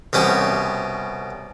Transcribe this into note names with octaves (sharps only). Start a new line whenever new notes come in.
C2 B2 C#4 G4